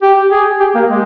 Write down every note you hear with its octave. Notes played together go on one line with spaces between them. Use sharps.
G4
G#4
G4
A#3
G#3